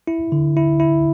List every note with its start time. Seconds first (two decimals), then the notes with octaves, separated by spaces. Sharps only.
0.07 E4
0.32 D3
0.57 E4
0.80 E4